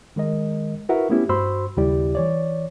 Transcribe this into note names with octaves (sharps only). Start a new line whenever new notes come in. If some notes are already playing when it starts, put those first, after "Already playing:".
D#3 G#3 A#4 D#5
E4 F#4 A#4 B4 E5 F#5
A3 B3 C#4 E4 G4
G2 F#4 C5 B5 C6 E6
D#2 C#3 G3 E4 G4 D5
E3 C#5 D5